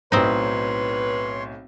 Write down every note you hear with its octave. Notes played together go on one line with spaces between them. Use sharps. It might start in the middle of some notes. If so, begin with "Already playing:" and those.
B1 A2 C4 D#4 B4 C#5 C6